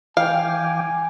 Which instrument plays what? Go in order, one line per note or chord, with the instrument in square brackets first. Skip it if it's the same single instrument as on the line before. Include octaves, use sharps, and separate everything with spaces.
[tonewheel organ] E3 G5 D6 [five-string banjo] F5 [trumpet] G#5